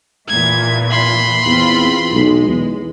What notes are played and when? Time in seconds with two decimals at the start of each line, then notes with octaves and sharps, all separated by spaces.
0.28 E2 A#2 E3 G#6
0.90 B5 C6
1.45 E2 C4 F4
2.12 B1 G#3
2.47 E2